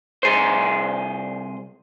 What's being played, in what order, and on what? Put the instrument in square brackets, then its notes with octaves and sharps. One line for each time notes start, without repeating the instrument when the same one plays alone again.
[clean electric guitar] C2 G#4 C5